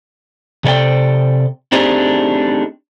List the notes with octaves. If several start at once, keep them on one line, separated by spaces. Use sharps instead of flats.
C3 A4 C#5 D5 G5
A3 C4 D4 D#4 G4 G#4